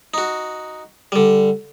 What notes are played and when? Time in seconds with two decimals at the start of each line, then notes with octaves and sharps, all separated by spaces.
0.14 D#4 F#4
1.12 D3 G3